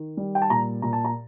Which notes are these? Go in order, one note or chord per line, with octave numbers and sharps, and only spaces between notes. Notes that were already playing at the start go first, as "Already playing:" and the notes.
Already playing: D#3
G3
G5
A5
A#2 A#5
A#2 A#5
A5
A#5